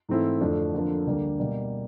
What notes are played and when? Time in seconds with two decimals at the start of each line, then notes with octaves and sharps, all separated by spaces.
0.09 G#2 E3 A3 C4 E4
0.40 F2 D3 F3 A3 D4
0.74 F2 D3 F3 A#3 D4
1.07 D2 D3 G3 A#3
1.39 B2 G3 A#3